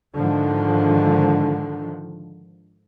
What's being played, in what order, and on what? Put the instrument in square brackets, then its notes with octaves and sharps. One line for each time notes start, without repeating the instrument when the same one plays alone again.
[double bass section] G#2 D3 D#3 F3